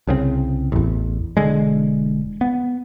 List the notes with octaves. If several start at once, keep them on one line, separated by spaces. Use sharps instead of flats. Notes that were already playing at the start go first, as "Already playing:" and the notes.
C2 C#3 F#3 C4
A1 E2
E1 D3 G#3
B3